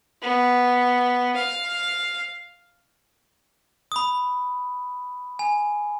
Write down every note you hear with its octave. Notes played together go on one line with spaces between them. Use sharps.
B3
F5
B5 D#6
G#5